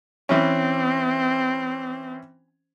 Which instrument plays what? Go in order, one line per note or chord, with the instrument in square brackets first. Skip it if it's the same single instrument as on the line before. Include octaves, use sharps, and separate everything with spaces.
[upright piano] E3 C#4 [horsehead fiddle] C4